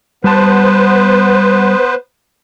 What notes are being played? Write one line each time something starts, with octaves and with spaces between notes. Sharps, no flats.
G3 B3 B4 C5 A5